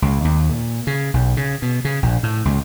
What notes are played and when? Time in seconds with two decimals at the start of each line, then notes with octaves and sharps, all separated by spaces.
0.02 C#2
0.25 D#2
0.49 A#2
0.87 C#3
1.14 B1
1.37 C#3
1.62 B2
1.85 C#3
2.03 A#1
2.23 A2
2.45 C#2